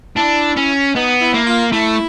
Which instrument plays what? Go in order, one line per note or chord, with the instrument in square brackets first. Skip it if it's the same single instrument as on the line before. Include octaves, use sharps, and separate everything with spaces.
[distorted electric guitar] D4 [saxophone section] E4
[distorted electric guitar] C#4
[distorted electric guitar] B3 [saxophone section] D#4
[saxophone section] E4
[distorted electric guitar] A#3
[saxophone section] F4
[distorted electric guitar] A3 [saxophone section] E4